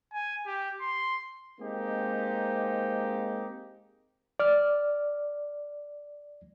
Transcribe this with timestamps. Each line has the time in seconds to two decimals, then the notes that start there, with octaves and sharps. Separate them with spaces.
0.13 G#5
0.46 G4
0.81 C6
1.59 G#3 A#3 C4 D#4 G4
4.40 D5 F6